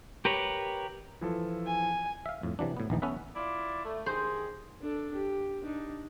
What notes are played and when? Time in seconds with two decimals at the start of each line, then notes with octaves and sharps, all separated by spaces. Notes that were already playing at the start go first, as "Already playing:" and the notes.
0.25 G4 A#4 B4 C#5
1.21 E3 F3 A4
1.67 G#5
2.26 E5 F5
2.43 F2 A2
2.59 C3 E3 F#3 D4
2.77 A2 B3
2.90 A#1 E2 E3 D#4
3.02 B3 C#4 A4 B4 E5
3.35 E4 F4 D5
3.85 A3
4.06 D#3 G4 G#4 C5
4.81 D4 A4
5.14 G4
5.63 D4 D#4